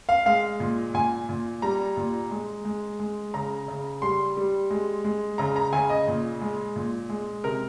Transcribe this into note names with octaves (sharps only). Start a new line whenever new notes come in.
F5
G#3 F5
A#2
A#2 G#5
A#2
G3 A#5
A#2
G#3
G#3
G#3
C#3 A#5
C#3
G3 C6
G3
G#3
G#3
C#3 A#5
A#5
C#3 G#5
D#5
A#2
G#3
A#2
G#3
C3 A#4